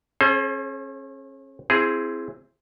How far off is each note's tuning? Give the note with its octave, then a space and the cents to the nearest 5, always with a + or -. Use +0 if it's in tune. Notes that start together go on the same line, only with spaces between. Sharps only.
C#4 -40 G#4 +40 C5 +20
C4 +0 E4 +25 G#4 +0